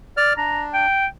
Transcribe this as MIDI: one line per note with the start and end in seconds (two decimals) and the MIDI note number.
0.17 0.33 74
0.17 0.33 89
0.37 0.86 62
0.37 0.64 82
0.74 1.06 79